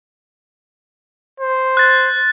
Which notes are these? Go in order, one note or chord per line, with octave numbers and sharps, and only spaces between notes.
C5
F#6 A6